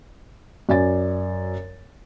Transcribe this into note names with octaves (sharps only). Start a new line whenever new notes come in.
F#2 D5 G#5 A6